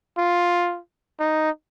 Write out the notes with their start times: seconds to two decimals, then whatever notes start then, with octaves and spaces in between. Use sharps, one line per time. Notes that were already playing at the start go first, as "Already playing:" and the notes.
0.18 F4
1.20 D#4